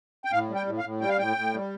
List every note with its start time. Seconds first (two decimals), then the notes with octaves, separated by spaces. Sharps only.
0.25 G5
0.32 A2 F5
0.49 G3
0.55 G5
0.66 A2
0.78 F5
0.84 A2
1.01 G3 G5
1.09 F5
1.18 A2 G5
1.37 A2
1.54 G3